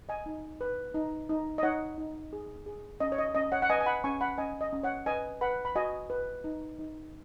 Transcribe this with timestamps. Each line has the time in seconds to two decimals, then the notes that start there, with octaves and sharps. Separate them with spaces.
0.09 D#5 G#5
0.26 D#4
0.61 B4
0.94 D#4
1.29 D#4
1.58 D#5
1.63 D#4 C#5 F#5
1.98 D#4
2.33 G#4
2.66 G#4
3.00 C#4 D#5
3.12 C#5
3.18 D#5
3.35 C#4 D#5
3.52 C#5 F#5
3.62 F#5
3.69 B4 D#5 G#5
3.81 G#5
3.86 F#5 B5
4.04 C#4 G#5 C#6
4.21 F#5 B5
4.38 C#4 D#5 G#5
4.61 D#5
4.72 C#4
4.83 C#5 F#5
5.06 B4 D#5 G#5
5.41 B4 F#5 B5
5.65 B5
5.76 F#4 D#5 G#5
6.10 B4
6.44 D#4
6.79 D#4